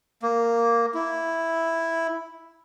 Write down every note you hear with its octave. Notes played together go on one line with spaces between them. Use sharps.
A#3
E4